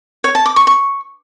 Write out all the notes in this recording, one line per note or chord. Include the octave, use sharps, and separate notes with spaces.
C#5
A5
D6
C#6
C#6